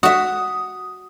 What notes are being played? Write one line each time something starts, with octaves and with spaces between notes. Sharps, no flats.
F#4 E5 D#6